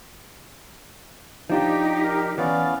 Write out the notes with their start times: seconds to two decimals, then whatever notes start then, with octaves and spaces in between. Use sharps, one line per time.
1.50 F3 D4 D#4 F4 G4
2.04 A#4
2.38 E3 B3 C#4 D5 F5